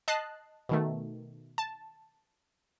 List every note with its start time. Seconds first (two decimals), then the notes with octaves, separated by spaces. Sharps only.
0.08 D#5 A5 F#6 C7
0.69 B2 D#3 A3
1.58 A5